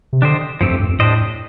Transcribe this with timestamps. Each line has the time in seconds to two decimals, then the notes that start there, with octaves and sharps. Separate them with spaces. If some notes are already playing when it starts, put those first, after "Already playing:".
0.13 C3
0.22 D3 D4 G4 C5 D#5
0.61 G2 F3 A3 C4 G4
0.70 F2
0.80 G2
0.89 F2
0.99 A2 D4 G4 C5 D#5